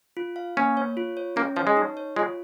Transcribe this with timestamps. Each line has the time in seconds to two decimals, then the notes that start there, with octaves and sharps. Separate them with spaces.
0.17 F4
0.36 F5
0.57 A#3 C#4
0.77 C#5
0.97 F4
1.17 C#5
1.36 A#3 C#4
1.56 F3 C#5
1.67 G#3
1.77 D#4
1.97 C#5
2.16 G#3 F4